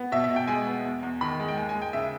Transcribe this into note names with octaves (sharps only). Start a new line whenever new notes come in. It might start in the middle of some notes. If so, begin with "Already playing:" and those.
Already playing: B3
B2 E5
E5
B2
G5
G#3 G#5
B3
E2
E2
D#3 B5
G#3
G5
D#2 G#5
G#5
G#3
G5
C#3 E5